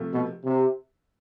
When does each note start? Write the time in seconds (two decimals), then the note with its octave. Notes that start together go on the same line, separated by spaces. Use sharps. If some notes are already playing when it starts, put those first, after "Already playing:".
Already playing: C3 F3 A3
0.12 B2
0.44 C3